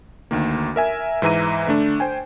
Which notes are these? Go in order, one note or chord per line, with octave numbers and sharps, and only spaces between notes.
D2 D#3 A#3
A#4 E5 G#5
G#2 E3 E5 A#5 D#7
D3 A3 D4
C5 G5 G#5